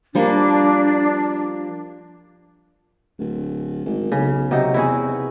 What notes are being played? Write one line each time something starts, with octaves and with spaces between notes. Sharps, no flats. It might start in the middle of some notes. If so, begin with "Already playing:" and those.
F3 G3 A#3 D4
D1
G#1
B1 C#3
C3 F#3 D#4
E2 E4 F#4 G#4